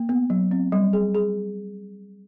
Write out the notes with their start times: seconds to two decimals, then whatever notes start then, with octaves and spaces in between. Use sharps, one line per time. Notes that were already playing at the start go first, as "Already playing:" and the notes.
Already playing: A#3
0.09 B3
0.30 F#3
0.51 C4
0.72 G3
0.93 G#4
1.15 G#4